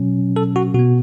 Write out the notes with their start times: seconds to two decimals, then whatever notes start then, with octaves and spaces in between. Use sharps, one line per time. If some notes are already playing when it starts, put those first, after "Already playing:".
Already playing: B2 F#3 C#4
0.36 A4
0.56 F#4
0.74 B2 B3 F#4